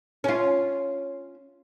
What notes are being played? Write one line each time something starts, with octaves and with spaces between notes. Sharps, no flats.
C#4 F4